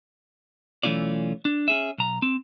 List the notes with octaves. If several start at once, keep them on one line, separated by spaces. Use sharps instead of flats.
B1 E3 A3 C#4 F4 D5
D4
C#4 G#4 E5
B1 A#5
C4